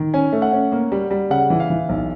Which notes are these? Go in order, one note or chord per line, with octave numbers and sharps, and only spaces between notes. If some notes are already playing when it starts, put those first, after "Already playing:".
Already playing: D#3
C#4 G#5
A3
F#5
C#4
A#3
G3
G3
C#3 F#5
E3
F5
E3
B1